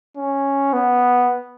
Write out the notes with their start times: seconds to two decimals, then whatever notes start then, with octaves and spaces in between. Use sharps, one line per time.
0.17 C#4
0.73 B3